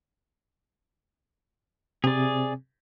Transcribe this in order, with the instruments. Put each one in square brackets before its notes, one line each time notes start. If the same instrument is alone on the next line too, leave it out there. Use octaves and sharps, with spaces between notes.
[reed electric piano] C3 C4 [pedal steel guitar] G#4 D5